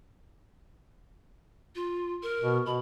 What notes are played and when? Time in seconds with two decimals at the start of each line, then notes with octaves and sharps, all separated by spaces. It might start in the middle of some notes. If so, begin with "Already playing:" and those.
1.75 F4
2.23 A#4
2.41 B2
2.66 B2 B5